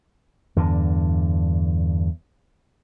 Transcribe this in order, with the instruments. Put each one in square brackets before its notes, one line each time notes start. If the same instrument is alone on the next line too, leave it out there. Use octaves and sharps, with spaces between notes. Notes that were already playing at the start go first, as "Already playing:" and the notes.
[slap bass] E2 G2 D3